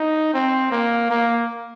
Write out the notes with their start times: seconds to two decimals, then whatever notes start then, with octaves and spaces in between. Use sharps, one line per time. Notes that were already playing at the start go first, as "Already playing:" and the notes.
Already playing: D#4
0.33 C4
0.71 A#3
1.10 A#3